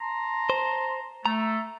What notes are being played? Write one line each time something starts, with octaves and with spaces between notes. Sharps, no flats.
A5 A#5 C6
C5
A3 A#5